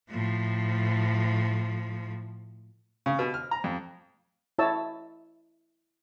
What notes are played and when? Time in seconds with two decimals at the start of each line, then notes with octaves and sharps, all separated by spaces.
0.11 A2 F3
3.06 C#3
3.19 B2
3.34 F6
3.51 A#5
3.64 F2
4.59 E4 C#5 D#5 A5 E6